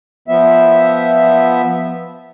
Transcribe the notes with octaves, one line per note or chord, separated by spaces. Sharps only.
F3 B3 E5